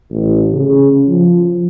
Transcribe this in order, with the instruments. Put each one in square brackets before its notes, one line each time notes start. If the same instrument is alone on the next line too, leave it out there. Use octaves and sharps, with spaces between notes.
[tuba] A1
C#3
F3